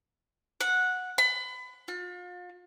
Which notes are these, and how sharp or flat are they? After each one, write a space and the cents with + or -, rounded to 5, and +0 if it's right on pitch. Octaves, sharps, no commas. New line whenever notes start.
F#5 -10
B5 +30
F4 +40